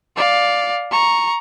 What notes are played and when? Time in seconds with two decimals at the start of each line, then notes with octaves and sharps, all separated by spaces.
0.16 D5 F5
0.91 A#5 C#6